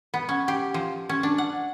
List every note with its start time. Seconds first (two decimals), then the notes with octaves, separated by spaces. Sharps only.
0.14 B3
0.29 C#4
0.48 G4
0.74 F3
1.09 C#4
1.23 D4
1.38 F#5